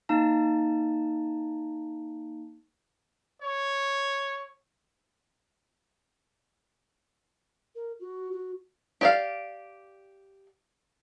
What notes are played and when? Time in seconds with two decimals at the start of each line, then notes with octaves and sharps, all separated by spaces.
0.09 A#3 D#4 A5
3.41 C#5
7.75 A#4
8.00 F#4
8.32 F#4
9.01 G4 D5 F5